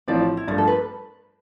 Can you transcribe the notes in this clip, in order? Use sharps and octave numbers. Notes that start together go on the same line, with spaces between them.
A1 A2 F3 C4 D5
E4
G2 F3 A3 F4
A4
B4